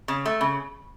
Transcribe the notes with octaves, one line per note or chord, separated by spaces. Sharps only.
C#3
A3
C#3